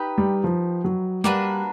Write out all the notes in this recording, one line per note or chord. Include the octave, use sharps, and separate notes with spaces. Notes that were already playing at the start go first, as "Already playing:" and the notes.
Already playing: D#4 G4 B4
G3
F3
F#3
G3 A#3 D4 F#4 B4